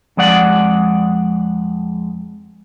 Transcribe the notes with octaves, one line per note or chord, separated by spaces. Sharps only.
F2 G#3 D5 F#5